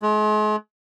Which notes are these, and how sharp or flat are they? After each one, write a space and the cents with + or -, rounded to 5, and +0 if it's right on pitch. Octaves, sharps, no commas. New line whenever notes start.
G#3 +40